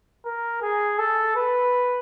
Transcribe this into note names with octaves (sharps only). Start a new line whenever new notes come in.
A#4
G#4
A4
B4